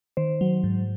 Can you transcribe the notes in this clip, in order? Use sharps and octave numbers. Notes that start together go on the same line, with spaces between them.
D#3 C5
F#3
G#2